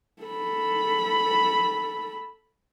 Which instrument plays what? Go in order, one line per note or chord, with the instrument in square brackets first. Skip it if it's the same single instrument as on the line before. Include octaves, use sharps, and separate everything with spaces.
[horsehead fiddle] A4 B5